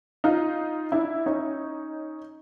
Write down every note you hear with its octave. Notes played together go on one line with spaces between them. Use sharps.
D#4 F4
D4 E4
C#4 D#4